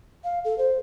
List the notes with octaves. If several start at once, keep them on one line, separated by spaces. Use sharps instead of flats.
F5
A4
C5